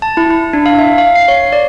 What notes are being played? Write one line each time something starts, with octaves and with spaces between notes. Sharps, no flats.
A5
E4
E4
D4
F5
E5
F5
C7
C#5
D5